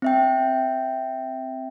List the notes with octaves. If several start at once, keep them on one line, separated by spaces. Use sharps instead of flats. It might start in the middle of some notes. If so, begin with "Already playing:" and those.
C4 E5 G5